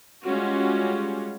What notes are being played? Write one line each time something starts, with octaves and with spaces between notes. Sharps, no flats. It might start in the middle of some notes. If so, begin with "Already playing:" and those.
G3 G#3 C#4 F4 F#4